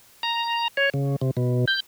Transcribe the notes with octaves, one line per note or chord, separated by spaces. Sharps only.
A#5
C#5
C#3
C3
B2
G6